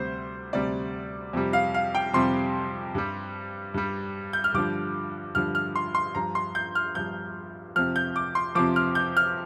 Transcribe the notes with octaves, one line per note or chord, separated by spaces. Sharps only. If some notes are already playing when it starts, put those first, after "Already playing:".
Already playing: D2 C3 G3 C5
D2 C3 G3 D5
F2 C3 G3
F5
F5
G5
F2 C3 G3 C6
G2 G3
G2 G3
G6
F6
G2 D3 F3 D6
G2 D3 F3 F6
F6
C6
C6
G2 F3 A#5
C6
G6
F6
G2 F3 G6
F2 C3 F3 F6
G6
D6
C6
F2 C3 F3 D6
F6
G6
F6